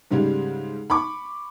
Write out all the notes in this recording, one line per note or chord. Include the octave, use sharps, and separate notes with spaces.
G#2 C#3 G3 G#3
B5 C#6 D6